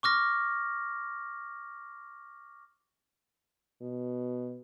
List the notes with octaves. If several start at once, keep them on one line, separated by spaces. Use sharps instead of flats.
C#6 D6 F6 A#6
B2